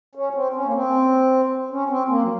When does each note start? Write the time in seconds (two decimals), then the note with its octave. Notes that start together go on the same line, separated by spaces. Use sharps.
0.15 C#4
0.34 C4
0.54 C#4
0.65 A#3
0.73 C4
1.71 C#4
1.90 C4
2.09 A#3
2.23 F#3